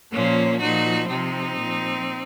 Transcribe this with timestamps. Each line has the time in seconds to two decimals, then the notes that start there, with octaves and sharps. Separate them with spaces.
0.12 A#2 F3 A#3 C#4
0.60 A#2 F3 D#4 F#4
1.08 C3 F3 C4 D#4
1.57 A#2 F3